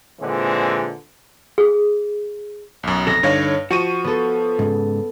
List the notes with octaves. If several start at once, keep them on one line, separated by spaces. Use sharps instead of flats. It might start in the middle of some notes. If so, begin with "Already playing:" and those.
A#2 D3 E3 G#3 C4
G#4
B1 F#2
F2 C3 A4 A#6
G2 D3 D#4 C#5 F5
F3 F#4 C#6 D#7
B3 A4
G#2 C#3